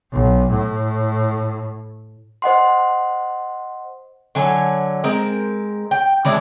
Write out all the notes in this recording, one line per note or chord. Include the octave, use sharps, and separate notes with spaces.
B1
A2
C5 D#5 F#5 C6
D3 F#3 G#5
G#3 C4 A#4
G5
E3 G#3 D4 E4